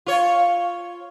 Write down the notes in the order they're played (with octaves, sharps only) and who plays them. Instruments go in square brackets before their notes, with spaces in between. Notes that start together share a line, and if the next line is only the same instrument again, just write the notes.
[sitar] F4 C#5